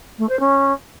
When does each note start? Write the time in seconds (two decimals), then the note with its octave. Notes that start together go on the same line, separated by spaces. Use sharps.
0.18 A3
0.29 C5
0.40 C#4